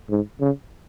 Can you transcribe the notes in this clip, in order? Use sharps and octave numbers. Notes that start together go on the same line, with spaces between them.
G#2
C#3